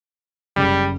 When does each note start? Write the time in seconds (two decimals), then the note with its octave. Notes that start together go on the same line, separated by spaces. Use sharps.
0.56 F#1 G3